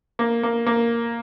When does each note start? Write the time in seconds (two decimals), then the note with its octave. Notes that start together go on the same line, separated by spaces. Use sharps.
0.19 A#3
0.43 A#3
0.66 A#3